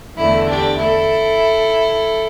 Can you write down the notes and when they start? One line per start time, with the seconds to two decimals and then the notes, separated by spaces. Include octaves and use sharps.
0.17 E2 D3 A3 E4
0.49 D4 G4
0.79 E4 A4